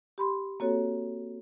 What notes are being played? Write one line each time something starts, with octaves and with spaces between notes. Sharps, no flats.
G4 B5 C6
A#3 C4 F#4 A4 C#5